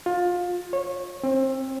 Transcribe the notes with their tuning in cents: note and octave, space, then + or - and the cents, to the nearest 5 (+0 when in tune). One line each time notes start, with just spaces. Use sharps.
F4 +20
C#5 -20
C4 +30